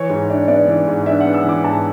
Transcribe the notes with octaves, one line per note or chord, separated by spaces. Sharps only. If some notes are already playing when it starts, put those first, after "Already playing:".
Already playing: E3 C#5
G#2
D4
B3 D5
E3
G#2
D4 E5
B3 F#5
E6
E3 D6
G#2 A5